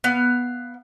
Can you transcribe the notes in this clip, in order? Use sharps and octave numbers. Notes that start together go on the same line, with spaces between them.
B3 F5